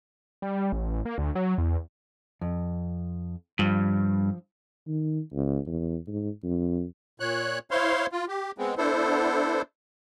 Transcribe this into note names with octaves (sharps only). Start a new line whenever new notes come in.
G3
A1
A#3
D2
F#3
E2
F2
G2 F3
D#3
C#2
E2
G#2
F2
A#2 C#5 F#6
E4 C5 C#5 F5 C6
F4
G4
G#3 B3 C4
B3 D4 E4 A4 C5